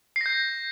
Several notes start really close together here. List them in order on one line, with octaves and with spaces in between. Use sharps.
C7 A#6 G6